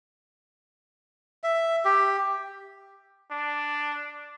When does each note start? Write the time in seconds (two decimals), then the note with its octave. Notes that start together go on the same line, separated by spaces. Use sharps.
1.44 E5
1.85 G4
3.31 D4